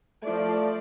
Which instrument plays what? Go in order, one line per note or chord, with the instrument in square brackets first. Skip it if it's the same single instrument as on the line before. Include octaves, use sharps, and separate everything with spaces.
[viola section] F3 D5 [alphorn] A3